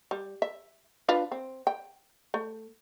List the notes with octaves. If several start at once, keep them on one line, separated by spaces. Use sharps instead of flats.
G3
E5
D4 F4 B4
C4
G5
A3